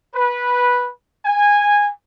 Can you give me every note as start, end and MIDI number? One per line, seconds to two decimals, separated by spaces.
0.15 0.88 71
1.25 1.91 80